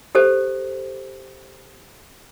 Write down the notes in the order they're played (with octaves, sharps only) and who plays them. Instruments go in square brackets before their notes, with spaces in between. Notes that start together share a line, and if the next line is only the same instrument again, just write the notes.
[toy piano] G4 A4 C5